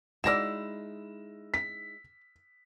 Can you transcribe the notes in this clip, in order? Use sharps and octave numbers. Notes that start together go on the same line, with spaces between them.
G#3 D#4 E4 F#4 D5 E6 A#6 E7
B6